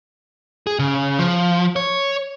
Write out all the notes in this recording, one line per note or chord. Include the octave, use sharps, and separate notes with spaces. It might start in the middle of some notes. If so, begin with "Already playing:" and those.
G#4
C#3
F3
C#5